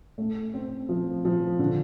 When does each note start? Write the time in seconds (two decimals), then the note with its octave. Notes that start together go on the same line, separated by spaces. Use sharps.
0.18 A3
0.54 C4
0.89 F3
1.25 F3
1.59 D3